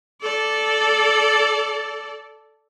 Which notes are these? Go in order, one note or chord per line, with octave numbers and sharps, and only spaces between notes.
A4 D5